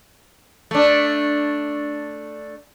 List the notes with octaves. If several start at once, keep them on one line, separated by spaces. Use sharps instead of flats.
A3 D4